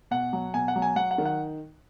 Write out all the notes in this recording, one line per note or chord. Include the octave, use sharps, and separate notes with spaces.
B2 F#5
F#3
B2 G#5
F#5
F#3
G#5
F#3 F#5
F#5
D#3
F#5